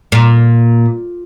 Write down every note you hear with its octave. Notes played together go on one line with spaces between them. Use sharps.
A#2